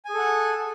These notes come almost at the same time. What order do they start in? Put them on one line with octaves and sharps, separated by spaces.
G#5 G#4 A4 F#5